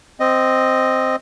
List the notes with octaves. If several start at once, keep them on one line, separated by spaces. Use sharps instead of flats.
C4 D#5